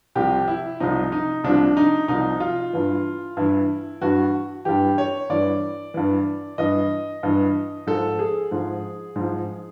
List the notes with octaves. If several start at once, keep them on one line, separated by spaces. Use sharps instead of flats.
C2 C3 F3 G4
E4
C2 C3 F3 D#4
D#4
C2 C3 F3 D4
D#4
C2 C3 F3 D#4
F4
G2 E3
G2 E3 E4
G2 E3 F#4
G2 E3 G4
C#5
G2 E3 D5
G2 E3
G2 E3 D#5
G2 E3
G#2 F3 A4
G#4
G#2 F3
G#2 F3